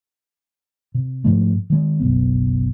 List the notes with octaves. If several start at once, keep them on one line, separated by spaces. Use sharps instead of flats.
C3
G#2 F3 A3
D#3 G#3
F#1 B1 B3